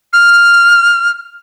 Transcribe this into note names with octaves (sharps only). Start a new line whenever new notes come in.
F6